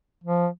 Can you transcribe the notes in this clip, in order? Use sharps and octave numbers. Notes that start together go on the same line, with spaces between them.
F3